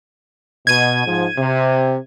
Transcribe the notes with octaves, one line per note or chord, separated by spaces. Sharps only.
B2 G#6 D#7
G#2 F3
C3